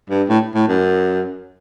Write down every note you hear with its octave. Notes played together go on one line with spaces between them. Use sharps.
G2
A2
A2
F#2